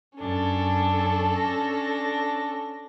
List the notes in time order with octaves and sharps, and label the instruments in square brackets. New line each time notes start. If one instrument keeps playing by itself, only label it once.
[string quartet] F#2 D4 [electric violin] C#4 A4
[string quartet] D4 A#6